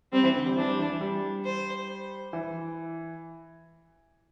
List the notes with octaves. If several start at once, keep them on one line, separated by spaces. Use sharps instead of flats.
G3 C4
E3
D3
G3
E3 D4
G3
E3
E3
G3
C5
E3